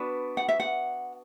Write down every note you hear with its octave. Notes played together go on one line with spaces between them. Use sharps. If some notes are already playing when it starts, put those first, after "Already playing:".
Already playing: B3 D4 F#4 B4
F#5
E5
F#5